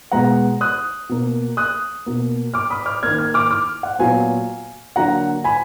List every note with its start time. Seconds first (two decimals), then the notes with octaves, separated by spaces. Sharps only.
0.11 B2 G#3 B3 F#5 A#5
0.61 D#6 F#6
1.09 B2 A#3
1.57 D#6 F#6
2.06 B2 A#3
2.54 D6 F6
2.70 B5 D#6
2.86 D6 F6
3.03 D#3 A#3 F6 G#6
3.18 F6 G#6
3.34 D6 F6
3.50 D6 F6
3.83 F#5
3.99 A#2 F#3 B3 F5 G#5
4.96 D3 F#3 A#3 F#5 A#5
5.44 G#5 B5